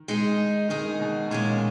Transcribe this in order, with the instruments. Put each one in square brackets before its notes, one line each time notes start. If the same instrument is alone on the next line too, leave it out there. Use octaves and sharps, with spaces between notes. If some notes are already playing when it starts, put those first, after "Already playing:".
Already playing: [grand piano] D#3
[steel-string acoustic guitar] G#3 D#4 G#4
[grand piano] D#3 [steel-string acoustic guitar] G#3 D#4 G#4
[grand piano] B2
[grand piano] A#2 [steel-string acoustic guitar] G#3 C#4 G#4